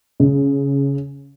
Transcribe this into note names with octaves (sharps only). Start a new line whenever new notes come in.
C#3